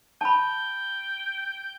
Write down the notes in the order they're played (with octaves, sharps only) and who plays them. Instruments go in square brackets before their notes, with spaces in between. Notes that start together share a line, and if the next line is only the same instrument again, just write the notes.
[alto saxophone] G5 [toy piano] A5 B5